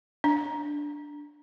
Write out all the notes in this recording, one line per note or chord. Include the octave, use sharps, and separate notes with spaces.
D4